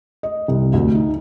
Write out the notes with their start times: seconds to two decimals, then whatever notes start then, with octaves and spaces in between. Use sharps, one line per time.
0.23 D#5
0.48 C2
0.73 D2
0.95 D#4